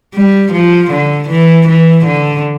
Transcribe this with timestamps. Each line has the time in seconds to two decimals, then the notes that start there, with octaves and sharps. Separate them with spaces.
0.14 G3
0.52 F3
0.91 D3
1.29 E3
1.67 E3
2.05 D3